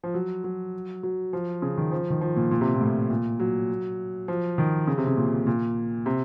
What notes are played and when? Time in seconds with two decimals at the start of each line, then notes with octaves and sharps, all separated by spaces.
0.04 F3
0.14 F#3
0.44 F#3
1.03 F#3
1.33 F3
1.62 C#3
1.77 D#3
1.92 F3
2.10 D#3
2.21 F3
2.36 A#2
2.51 A#2
2.61 C3
2.74 A#2
2.81 A2
3.10 A#2
3.40 F#3
4.28 F3
4.58 D#3
4.88 C#3
4.98 C3
5.07 C#3
5.17 A#2
5.47 A#2
6.06 C3